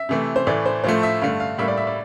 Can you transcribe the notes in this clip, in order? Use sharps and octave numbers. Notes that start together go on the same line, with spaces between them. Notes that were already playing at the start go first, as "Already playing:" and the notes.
Already playing: E5
C3 E3 A3
C5
A2 E3 A3 D5
C5
A2 F3 A3 C5
E5
G2 D3 A3 F5
F5
A2 G3 A#3 E5
D5
E5
D5